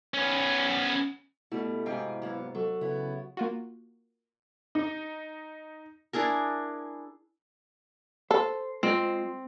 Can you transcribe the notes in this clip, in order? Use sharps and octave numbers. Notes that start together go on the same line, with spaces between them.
B3 C#4
B2 G3 A3 E4
G#2 C3 G#4 F5 G5
F#3 A#3 B3
F#3 A4
C#3 B3 E4
A#3 F4 F#4
D#4
D4 E4 G#4 A#4
A4 C5
G#3 C4 F4 D#5